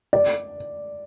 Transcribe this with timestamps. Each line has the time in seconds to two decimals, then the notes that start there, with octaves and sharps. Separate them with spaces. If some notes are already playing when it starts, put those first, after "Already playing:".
0.13 D5